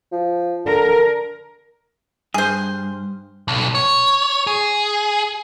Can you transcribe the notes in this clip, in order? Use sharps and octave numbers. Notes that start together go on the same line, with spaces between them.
F3
D3 A#4
G2 G#4 C5
B1
C#5
G#4